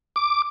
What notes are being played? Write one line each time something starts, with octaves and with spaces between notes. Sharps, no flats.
D6